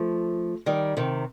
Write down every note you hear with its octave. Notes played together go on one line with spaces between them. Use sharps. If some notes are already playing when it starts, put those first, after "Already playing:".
Already playing: F3 A3
D#3 G3
C3 D#3